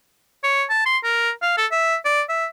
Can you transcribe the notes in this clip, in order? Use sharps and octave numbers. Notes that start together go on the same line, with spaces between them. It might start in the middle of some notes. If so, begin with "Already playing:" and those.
C#5
A5
C6
A#4
F5
A4
E5
D5
E5